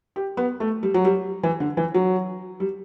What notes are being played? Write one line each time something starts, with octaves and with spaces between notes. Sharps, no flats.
G4
B3
A3
G3
F#3
G3
E3
D3
E3
F#3
G3